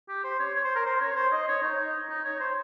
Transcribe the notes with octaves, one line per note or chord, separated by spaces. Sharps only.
G4
C5
C#5
C#5
C5
A#4
C5
C#5
C5
D#5
C#5
D#4
D#4
C#5
C5